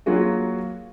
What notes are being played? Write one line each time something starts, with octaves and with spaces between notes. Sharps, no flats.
F#3 A#3 F4 F#4 G#4